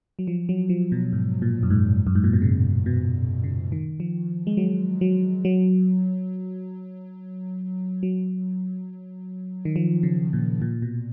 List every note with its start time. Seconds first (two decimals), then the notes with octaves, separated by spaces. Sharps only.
0.19 F#3
0.27 F3
0.49 F#3
0.69 F3
0.92 B2
1.13 G#2
1.42 A#2
1.63 F#2
1.70 G#2
2.07 F#2
2.15 G#2
2.24 A#2
2.33 B2
2.42 C#3
2.86 B2
3.44 C#3
3.72 D#3
4.00 F3
4.47 G#3
4.57 F#3
5.01 F#3
5.45 F#3
8.03 F#3
9.65 D#3
9.76 F3
10.03 C#3
10.33 A#2
10.62 A#2
10.82 B2